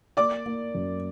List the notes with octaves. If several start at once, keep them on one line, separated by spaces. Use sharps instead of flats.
A#3 D5 D6
A#3
F#2